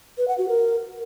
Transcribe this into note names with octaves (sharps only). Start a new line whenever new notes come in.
B4
F#5
F#4
A#4